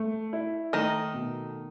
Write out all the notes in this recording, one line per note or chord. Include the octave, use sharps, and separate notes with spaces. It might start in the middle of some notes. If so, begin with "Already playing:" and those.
Already playing: A3
E4
D#3 A3 D#4
B2